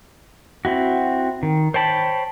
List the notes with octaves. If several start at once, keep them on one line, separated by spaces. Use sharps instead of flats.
C4 E4 F#4
D#3
C5 C#5 G5 A5 B5